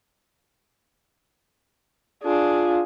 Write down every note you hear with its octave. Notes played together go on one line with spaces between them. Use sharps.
D4 F4 G#4